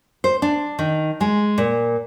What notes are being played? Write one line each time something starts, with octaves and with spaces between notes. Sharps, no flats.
C5
D4
D#3
G#3
A#2